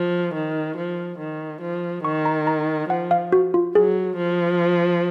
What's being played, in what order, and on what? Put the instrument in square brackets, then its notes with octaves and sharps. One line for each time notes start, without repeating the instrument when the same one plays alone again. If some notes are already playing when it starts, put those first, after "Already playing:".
Already playing: [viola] F3
D#3
F3
D#3
F3
[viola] D#3 [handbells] C#6
[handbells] A#5
A#5
[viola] F3 [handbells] F#5
[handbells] F5
F#4
F4
[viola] F#3 [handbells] G#4
[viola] F3